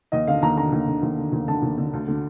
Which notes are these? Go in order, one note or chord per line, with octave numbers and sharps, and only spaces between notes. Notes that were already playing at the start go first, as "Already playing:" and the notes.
D#2 D#5
D3 F5
D#2 A#5
D3 A#5
D#2
D3
D#2
D3
D#2
D3 A5
D#2
D3
D2
D3